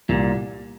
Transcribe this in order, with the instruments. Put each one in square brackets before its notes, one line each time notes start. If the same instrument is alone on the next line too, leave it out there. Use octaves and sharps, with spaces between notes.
[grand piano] C2 [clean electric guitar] A#2